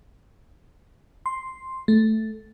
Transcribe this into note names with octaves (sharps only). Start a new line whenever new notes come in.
C6
A3